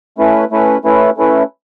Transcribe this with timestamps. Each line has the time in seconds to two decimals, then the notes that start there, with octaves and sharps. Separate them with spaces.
0.18 A3 C#4 E4 B4
0.51 A3 C#4 E4 B4
0.84 A3 C#4 E4 B4
1.17 A3 C#4 E4 B4